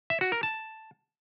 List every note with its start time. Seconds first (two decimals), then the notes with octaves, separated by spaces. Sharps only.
0.10 E5
0.21 F#4
0.32 A#4
0.43 A5